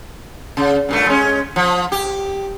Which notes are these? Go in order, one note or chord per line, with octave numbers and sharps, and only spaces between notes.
C#3
G2 A#2 A3
G#3 C#4
F3
G4